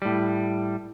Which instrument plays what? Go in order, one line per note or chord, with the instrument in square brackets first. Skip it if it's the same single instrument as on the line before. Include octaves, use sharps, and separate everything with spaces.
[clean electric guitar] A2 G3